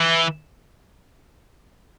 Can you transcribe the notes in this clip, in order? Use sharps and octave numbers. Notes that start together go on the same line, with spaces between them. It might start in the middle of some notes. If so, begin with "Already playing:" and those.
Already playing: E3